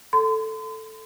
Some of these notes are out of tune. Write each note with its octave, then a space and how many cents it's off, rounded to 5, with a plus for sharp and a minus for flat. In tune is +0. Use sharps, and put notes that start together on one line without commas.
A4 +0 C6 -35